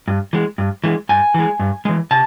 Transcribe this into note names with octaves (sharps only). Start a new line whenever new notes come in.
G2
E3 G#3
G2
E3 G#3
G2 G#5
E3 G#3
G2
E3 G#3
C3 A5